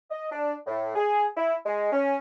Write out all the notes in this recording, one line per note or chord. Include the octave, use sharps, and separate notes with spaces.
D#5
D4
A2
G#4
E4
G#3
C#4